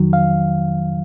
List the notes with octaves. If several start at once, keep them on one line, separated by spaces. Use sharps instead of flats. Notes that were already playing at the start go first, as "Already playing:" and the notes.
Already playing: F2 D#3 F#3
F5